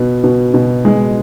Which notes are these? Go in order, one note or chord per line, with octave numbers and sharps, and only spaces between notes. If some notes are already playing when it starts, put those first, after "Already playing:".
Already playing: B2 B3
B2
B2
G#3